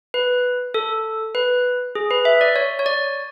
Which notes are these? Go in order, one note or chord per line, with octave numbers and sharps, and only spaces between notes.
B4
A4
B4
G#4
B4
E5
D5
C#5
C#5
D5